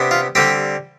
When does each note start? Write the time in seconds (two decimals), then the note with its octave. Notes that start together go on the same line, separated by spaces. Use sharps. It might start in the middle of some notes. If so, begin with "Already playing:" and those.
Already playing: C3 B3 D4
0.11 F4
0.35 D3 G3 C4 G4